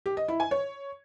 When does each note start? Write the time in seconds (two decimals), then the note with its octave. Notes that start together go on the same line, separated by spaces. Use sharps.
0.06 G4
0.17 D#5
0.28 E4
0.40 G#5
0.51 C#5